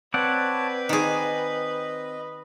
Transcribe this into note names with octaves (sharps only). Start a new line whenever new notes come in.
C4 B4 C#5 D5 F#5 A5
D#3 G#4 D#5